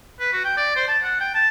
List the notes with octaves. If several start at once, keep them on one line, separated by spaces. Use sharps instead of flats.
B4
F#4
G5
D5
C5
A5
F#5
G5
A5